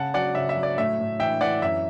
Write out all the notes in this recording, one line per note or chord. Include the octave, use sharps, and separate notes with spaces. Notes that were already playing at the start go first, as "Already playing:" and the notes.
Already playing: C#3 F#5 A5
F#3 D5 F#5
C#3 E5
E5
F#3
D5
A2 E5
A2
E3 E5 G5
E3 D5 F#5
F#2 E5